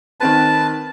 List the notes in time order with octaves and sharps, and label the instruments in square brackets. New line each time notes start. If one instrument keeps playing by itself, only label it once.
[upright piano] D#3 C4 B4 [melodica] A5